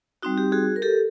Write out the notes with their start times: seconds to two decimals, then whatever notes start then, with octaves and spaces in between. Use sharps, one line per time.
0.23 G3 C4 D#4 F#4
0.38 G4
0.52 F#4 G#4
0.76 A#4
0.82 G4 A4